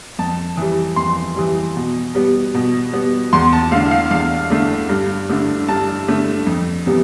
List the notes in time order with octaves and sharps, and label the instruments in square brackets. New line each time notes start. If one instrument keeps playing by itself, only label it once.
[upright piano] F2 A5
E3 G3
F2 C6
E3 G3
B2
G3 B3
B2
G3 B3
E2 C6
A5
D3 A3 F5
F5
E2 F5
D3 A3
G2
D3 A3
G2 A5
D3 A3
F2
C3 E3 G3 B3